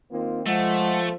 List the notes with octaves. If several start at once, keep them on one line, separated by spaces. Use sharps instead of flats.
D#3 A#3 C4 F4
F3 G#3 A3 F#5